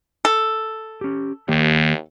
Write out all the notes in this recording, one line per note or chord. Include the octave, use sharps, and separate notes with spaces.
A4
C#4 G4
D#2 D#3 A#3 G4